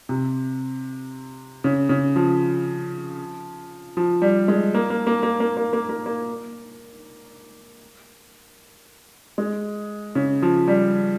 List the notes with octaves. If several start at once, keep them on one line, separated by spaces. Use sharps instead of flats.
C3
C#3
C#3
F3
F3
G3
G#3
A#3
A#3
A#3
A#3
A#3
A#3
A#3
A#3
A#3
G#3
C#3
F3
G3